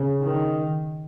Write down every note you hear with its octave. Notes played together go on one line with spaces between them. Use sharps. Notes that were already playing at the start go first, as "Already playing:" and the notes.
Already playing: C#3
D#3